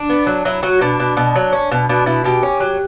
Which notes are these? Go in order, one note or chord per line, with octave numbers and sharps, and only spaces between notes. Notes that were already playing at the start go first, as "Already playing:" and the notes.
Already playing: D4
B3
F#3
F#3 E4
F#3 F#4
B2 D4
B2
B2
F#3
C#4
B2
B2 D4
B2 E4
B2 G4
C#4
F#3